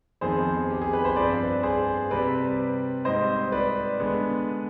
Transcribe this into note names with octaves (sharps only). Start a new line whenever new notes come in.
F2 D#3 B3 G#4 C5
G4
G#4
B4
C5
G2 F3 C4 B4 D5
G#4 C5
C3 G3 C4 B4 D5
G#2 G3 C4 C5 D#5
B4 D5
D3 G#3 B3